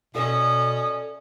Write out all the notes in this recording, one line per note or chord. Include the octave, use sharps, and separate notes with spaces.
B2 C#4 A4 D5 E5 D#6